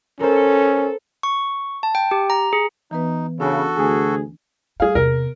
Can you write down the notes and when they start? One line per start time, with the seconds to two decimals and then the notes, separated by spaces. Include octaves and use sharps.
0.20 C#4 A4 A#4 C5
1.23 C#6
1.83 A5
1.95 G5
2.11 G4
2.30 A#5
2.53 G#4
2.91 E3 B3 D#4 B4
3.40 C#3 D4 F#4 A4
3.78 D2 G#4
4.80 G3 G#4 F5
4.95 E2 C3 A#4